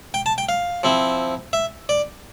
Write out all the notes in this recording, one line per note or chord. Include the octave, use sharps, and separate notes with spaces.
G5
A5
G5
F5
F3 C4 E4
E5
D5